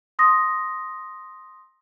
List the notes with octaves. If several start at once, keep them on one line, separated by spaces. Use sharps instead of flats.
C6 D#6 A#6